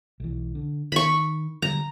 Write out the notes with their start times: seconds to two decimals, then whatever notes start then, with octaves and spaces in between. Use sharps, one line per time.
0.20 B1 E3
0.55 D3
0.92 D#3 B5 C#6
1.62 D3 F#3 G3 A#5